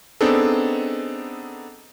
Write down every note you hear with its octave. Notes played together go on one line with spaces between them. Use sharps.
B3 C4 D4 D#4 G#4 A4